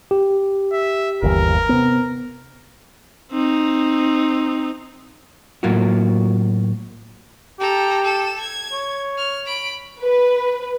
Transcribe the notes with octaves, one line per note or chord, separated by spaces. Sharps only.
G4
E5
G1 D#2 E3 A#4
C3 B3
C4 D#4
A2 F#3 A#3 F4 F#4
G4 A4 A#5
A4 E7
G#6
C#5
F6
B5 D7
B4